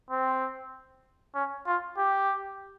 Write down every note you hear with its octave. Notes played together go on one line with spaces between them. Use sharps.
C4
C#4
F4
G4